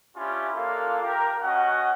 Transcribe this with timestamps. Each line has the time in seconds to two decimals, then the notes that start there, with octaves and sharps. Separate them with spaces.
0.17 C#4 D4 E4 F4 G4
0.54 A#3 D4 F4 A4 F5
1.02 G4 A#4
1.42 C#4 F#4 D#5 F#5